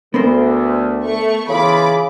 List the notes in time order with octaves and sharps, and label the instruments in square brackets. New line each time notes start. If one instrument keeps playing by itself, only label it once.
[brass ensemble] D2 [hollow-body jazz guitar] B3 A#4 C5
[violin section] A3 C#6
[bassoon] C#3 [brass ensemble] E3 F4 G#4 [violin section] B5 D6